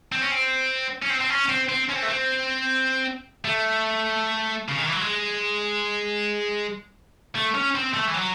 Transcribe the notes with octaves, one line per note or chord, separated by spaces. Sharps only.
C4
C#4
C4
C#4
C4
C4
C#4
C4
C4
C#4
C4
A3
C4
A3
C#3
D#3
E3
F#3
G#3
A3
C#4
C4
A3
E3
F#3